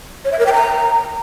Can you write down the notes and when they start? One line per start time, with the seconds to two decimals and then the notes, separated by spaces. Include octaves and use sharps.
0.25 C#5
0.32 E5
0.39 A#4
0.46 G5
0.53 A#5